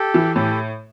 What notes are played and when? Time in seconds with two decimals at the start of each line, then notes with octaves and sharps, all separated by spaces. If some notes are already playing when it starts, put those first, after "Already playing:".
Already playing: G4 A4
0.14 E3
0.36 A2 G4 A4